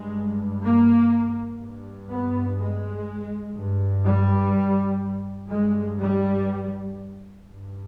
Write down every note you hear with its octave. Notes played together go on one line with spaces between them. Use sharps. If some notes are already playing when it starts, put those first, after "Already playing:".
Already playing: G2 G#3
A#3
G2
B3
G#3
G2
G3
G2 G#3
G3
G2